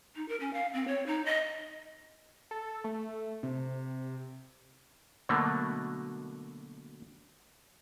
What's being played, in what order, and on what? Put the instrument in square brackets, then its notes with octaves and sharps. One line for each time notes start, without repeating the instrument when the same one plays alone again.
[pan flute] D#4
A#4
C#4
F5
C4
C#5
D#4
D#5
[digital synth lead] A4
A3
C3
[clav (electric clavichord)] B2 D3 F#3 A3 A#3